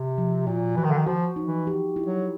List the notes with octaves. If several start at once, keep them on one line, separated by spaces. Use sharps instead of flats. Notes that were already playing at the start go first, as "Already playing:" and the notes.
Already playing: C3
F3
A#2 F#4
E3 F#4
D#3
D3
D#3
F3 F#4
D#4
E3
G4
E4
F#3